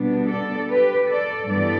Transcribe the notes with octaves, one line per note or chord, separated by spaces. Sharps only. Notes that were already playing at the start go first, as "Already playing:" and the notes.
Already playing: B2 G3 B3 D4
A4 D5
G4 B4
A4 D5
G2 E3 B3 A4 D5